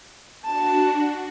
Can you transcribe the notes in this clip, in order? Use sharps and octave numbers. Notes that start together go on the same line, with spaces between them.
D4 F#4 A5